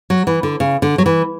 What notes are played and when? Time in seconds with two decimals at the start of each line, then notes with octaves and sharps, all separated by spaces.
0.10 F#3
0.27 E3
0.43 D3
0.60 C#3
0.82 D3
0.98 F#3
1.06 E3